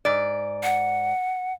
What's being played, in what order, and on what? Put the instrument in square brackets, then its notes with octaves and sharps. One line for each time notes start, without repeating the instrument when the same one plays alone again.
[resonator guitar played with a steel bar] G#2 D5
[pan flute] F#5